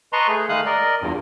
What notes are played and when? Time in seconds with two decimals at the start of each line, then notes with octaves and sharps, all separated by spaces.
0.13 B4 D#5 A5 A#5 C6 C#6
0.28 A3 G#4
0.49 D#3 G#3 A3 F5 D#6 F#6
0.66 A#4 D5 D#5
1.01 E2 G2 A#2